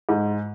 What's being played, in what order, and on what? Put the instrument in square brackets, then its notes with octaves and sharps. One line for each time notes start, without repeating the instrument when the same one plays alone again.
[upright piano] G#2